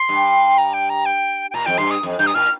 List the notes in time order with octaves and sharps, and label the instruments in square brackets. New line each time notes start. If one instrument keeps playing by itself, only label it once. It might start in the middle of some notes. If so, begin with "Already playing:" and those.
Already playing: [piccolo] C6
[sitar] G2
[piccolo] A#5
G5
A#5
G5
G5
[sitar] A#2 [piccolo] A#5
[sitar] F2 [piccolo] G5
[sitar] G2 [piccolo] C6
[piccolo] D#6
[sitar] F2
[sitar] G2 [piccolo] G6
[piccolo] D#6
[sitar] A#2 [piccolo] F6